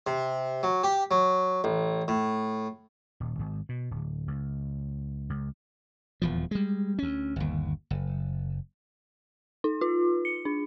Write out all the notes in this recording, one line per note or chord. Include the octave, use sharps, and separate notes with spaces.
C3
F#3
G4
F#3
A1
A2
D#1
G#1
B2
D1
C#2
C#2
D#1 E2 F3
G3 G#3
D2 C#4
G1 D#2
F#1
D#4
F4
C#7
D4